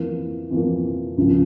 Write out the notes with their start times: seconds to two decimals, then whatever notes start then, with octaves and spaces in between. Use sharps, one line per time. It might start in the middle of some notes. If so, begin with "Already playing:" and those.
Already playing: F2 E3 A#3
0.51 F2 E3 A#3
1.18 C#2 C#3 F3